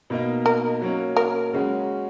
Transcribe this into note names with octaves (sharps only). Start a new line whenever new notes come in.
B2 A#3 D#4
A#4
F#3 A#3 C#4
A#4
C#3 G#3 C#4 F#4